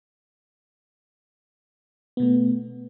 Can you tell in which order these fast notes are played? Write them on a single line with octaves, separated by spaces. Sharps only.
B3 B2 A3